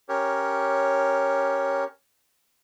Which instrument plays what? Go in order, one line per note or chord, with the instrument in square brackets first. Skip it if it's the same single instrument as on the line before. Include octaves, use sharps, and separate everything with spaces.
[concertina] C#4 G4 A#4 C#5